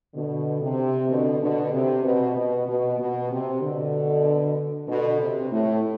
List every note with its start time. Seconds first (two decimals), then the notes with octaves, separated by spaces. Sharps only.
0.14 B2 D3
0.62 C3
1.09 B2 D3
1.41 B2 D3
1.72 C3
2.04 B2
2.36 B2
2.67 B2
2.99 B2
3.30 C3
3.62 B2 D3
4.88 B2 D3
5.20 C3
5.51 A2